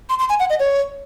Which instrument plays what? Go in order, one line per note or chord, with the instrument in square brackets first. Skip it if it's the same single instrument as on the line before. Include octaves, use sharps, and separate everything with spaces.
[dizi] C6
C6
G#5
F#5
D#5
C#5